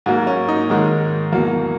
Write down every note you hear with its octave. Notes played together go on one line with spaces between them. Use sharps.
G#2 F#3 A#3
C#4
D#4
G#2 D#3 G#3
E2 B2 F#3 A#3